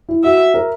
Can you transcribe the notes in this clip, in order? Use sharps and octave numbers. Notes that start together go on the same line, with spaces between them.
E4
F#4 E5
A#4